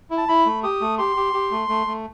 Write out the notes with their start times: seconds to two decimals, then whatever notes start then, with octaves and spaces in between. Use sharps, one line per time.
0.11 E4
0.18 A5
0.28 E4 B5
0.46 A3
0.63 G4 D#6
0.81 A3
0.98 G4 C6
1.16 G4
1.33 G4
1.51 A3
1.69 A3
1.87 A3